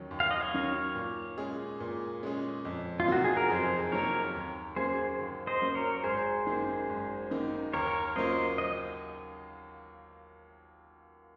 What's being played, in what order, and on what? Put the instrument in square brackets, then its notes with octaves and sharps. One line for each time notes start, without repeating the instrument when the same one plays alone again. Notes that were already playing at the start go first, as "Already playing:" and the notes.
Already playing: [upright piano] D#2 D#3 F#3 C#4
D#2
[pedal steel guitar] F5
D#5
C#5 F5
[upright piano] D#3 F#3 C#4
A#2
G#3 C#4 G#4
A#2
G#3 C#4 G#4
F2
[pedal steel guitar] F4
[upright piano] C3 D#3 F#3 A#3 [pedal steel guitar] F#4
[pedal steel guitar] G#4
A#4
[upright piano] F2 [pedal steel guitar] G#4 C5
[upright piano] C3 D#3 F#3 A#3 [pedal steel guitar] A#4 C#5
[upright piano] D#2
[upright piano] C#3 F#3 A#3 [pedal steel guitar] G#4 C5
[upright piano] D#2
[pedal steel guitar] C5 D#5
[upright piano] C#3 F#3 A#3
[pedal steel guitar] A#4 C#5
[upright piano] G#1 [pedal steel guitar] G#4 C5
[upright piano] F#2 D#3 A#3 D#4
G#1
F#2 D#3 A#3 D#4
[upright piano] D#2 [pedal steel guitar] A#4 C#5
[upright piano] C#3 F#3 A#3 F4 [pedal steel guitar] C5 D#5
[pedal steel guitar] D#5